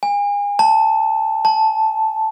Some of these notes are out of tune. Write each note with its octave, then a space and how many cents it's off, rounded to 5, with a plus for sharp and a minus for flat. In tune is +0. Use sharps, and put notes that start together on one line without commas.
G#5 -35
A5 +5
A5 -5